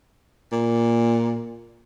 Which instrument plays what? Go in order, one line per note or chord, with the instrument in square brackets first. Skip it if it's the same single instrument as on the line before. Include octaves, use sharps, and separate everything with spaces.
[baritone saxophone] A#2